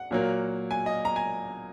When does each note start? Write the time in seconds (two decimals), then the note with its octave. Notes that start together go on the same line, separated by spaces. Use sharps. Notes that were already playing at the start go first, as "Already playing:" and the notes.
Already playing: F#5
0.11 A#2 F#3 A#3
0.71 G#5
0.86 D#5
1.05 A#5
1.16 G#5